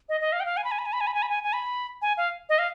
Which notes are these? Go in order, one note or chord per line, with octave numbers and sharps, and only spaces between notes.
D#5
D#5
F5
G5
F5
G#5
B5
G#5
B5
G#5
B5
G#5
B5
G#5
B5
G#5
G#5
B5
G#5
F5
D#5
F5